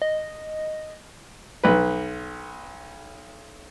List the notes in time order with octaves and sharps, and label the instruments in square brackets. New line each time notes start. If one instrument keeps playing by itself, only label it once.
[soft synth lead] D#5
[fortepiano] B1 B4